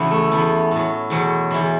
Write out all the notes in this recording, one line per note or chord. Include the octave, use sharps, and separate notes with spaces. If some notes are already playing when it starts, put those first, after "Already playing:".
Already playing: E2 C#3 E3 B3 C#4 E4 F#4
A3
E2 E3 B3
A2 F#3
E2 B2 F#3
E2 E3